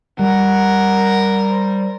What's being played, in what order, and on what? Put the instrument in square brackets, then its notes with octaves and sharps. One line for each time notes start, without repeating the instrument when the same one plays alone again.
[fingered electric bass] G3 [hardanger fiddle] A#4 [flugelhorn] F#5
[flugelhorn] C5